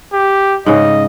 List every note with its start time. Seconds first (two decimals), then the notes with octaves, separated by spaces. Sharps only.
0.13 G4
0.66 G#2 C#3 D#5